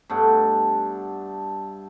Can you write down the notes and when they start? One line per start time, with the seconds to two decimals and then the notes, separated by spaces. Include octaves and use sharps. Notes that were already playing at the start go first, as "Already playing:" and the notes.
0.10 G2 A3 B3 D4